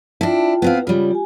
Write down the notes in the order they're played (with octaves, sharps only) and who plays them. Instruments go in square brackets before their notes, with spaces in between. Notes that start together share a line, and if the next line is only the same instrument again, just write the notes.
[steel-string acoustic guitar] D4 E4 [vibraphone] F4 G5 A5
[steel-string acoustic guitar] B3 C4 F5
[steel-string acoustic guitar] C#3 G3 [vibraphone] F4
[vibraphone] G4 G#5